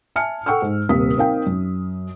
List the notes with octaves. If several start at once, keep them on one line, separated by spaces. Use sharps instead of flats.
E5 G#5 A5 F6 C#7
A4 F#5 G5 C#6 E6 F6
G#2
D#1 C3 A#3 G4 D#6 B6
C4 D#4 A#4 F5 G5
F#2